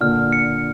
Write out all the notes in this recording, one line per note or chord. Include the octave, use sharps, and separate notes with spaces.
A#2 D3 F6
C#7